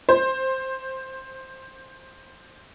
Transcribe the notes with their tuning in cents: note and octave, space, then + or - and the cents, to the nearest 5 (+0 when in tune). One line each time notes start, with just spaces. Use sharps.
C5 +10